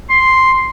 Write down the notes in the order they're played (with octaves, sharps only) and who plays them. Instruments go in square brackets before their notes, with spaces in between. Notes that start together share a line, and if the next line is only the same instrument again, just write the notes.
[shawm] C6